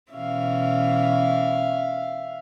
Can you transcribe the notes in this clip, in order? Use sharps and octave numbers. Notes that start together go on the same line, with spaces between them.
B2 E3 C#4 E5 F5